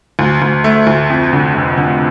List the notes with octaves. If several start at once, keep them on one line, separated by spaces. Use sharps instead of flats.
D2
D2
A3
D2
F2
D3
F1
D3